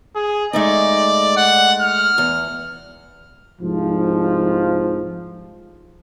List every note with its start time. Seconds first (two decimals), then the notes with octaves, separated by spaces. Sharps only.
0.16 G#4
0.53 G#3 A3 D#4 D5
1.37 F#5
1.81 F6
2.18 E2
3.62 C2 G#2 F3